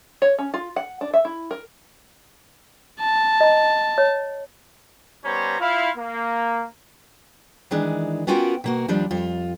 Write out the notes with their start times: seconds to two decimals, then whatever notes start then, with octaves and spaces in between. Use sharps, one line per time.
0.22 C#5
0.38 C#4
0.54 F4
0.76 F#5
1.01 D4
1.13 E5
1.25 E4
1.51 A#4
3.00 A5
3.41 D#5 A#5
3.98 C#5
5.25 G3 B3 C#4 C5 C#5 A#5
5.60 E4 F4 F5
5.97 A#3
7.71 D#3 E3 G#3 D4
8.27 B3 C#4 F4 F#4 A#4 G5
8.64 B2 A#3 F#4
8.88 D#2 F3 G3 D4 F4
9.11 F2 F4